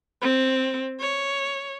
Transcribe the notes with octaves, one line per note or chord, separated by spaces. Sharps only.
C4
C#5